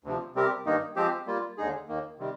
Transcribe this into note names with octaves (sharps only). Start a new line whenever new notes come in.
D2 C3 F3
C3 G3 C4 G4 A#4
G2 D#3 A#3 D#4
F3 G#3 C4 G4 C5
G3 A#3 F4
D#2 D3 G#3 D#4 G#4
D#2 D#3 A#3
C3 D#3 G3